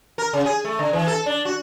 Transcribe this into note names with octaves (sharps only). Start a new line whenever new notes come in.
A#4
C#3
G#4
A3
D3
E3
A4
D4
F#4